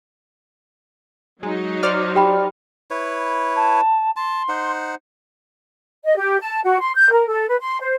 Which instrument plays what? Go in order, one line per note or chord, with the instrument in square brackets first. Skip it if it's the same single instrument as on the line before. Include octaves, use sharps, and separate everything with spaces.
[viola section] F#3 D#4 [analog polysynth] G#3
[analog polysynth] C5 D5 F6
[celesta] G4 G5 B5
[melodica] E4 B4 C#5
[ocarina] A5
[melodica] A5 [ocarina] C6
[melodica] D#4 C5 F#5
[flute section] D#5
G4
A5
F#4
C6
G6
A#4
A4
B4
C6
C5